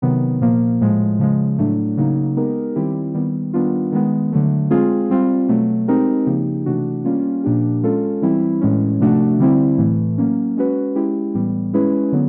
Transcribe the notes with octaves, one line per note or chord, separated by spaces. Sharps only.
C3 D#3 F#3 B3
A#2 F3 A#3
A2 F3 G#3
C#3 F3 G#3
A2 F#3 A3 D4
C#3 F#3 A#3 D#4
G#3 B3 D#4 G4 A#4
D#3 G3 C4 E4 G4
D#3 G3 B3
D#3 G3 B3 D4 F4
D#3 G#3 B3
D3 F#3 A3
G#3 C4 F4 G#4
G3 C4 F4
B2 F#3 A3
G#3 C4 D#4 G4 A#4
C#3 F3 A#3 D#4 G4
C3 E3 A3 D4 F#4
G3 A#3 C#4 F4
A#2 F3 A#3 D4 G4
G#3 C#4 F4 A4
E3 G3 C4 E4
A2 E3 G#3 C#4
C3 F3 A3 D4 F#4
D3 G3 C4 E4
A2 E3 A3
F#3 A#3 C#4
G#3 C#4 F#4 B4
G#3 C#4 E4 G4
A2 E3 G3 B3
G#3 C#4 E4 G#4 B4
D3 F#3 B3